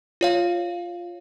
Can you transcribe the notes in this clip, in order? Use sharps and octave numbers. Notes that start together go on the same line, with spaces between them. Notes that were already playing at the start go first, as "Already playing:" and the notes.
F4 C#5 F5